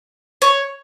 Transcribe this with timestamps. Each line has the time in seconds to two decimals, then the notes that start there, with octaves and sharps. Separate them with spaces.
0.42 C#5